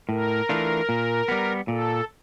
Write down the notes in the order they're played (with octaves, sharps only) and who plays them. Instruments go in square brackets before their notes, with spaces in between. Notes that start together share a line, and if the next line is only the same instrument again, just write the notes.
[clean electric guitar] A2 [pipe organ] A#4
[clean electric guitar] E3 A3 D4 F4
A#2
G3 B3
[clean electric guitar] A#2 [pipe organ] A4